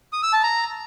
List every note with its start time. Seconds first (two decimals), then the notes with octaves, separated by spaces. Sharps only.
0.13 D#6
0.23 E6
0.33 A5
0.43 A#5